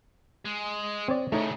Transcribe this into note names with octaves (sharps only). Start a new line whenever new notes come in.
G#3
C4 C#5 D5
A2 C#3 A3 D#4 C#5